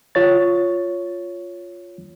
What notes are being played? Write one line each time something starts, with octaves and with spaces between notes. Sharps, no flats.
F4 C#5 A6